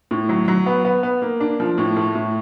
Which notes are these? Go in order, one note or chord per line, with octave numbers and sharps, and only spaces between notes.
A2
F#3
F#3
B3
B3
B3
A#3
D4
F3
A2
A3
A2